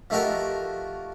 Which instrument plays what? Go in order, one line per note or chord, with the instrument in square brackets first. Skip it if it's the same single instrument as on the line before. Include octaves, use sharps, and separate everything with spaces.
[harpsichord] F3 A3 D#4 F#4 G4 A#4